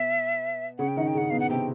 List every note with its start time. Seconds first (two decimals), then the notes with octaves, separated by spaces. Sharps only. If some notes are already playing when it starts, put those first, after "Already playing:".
Already playing: B2 B3 E5
0.78 C#3 C#4 F#5
0.88 G5
0.97 D#3 D#4 F#5
1.07 G5
1.15 C#3 C#4 F#5
1.30 B2 B3 F5
1.40 F#5
1.49 C3 C4 G5